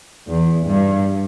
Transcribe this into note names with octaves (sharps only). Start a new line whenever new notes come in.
E2
G2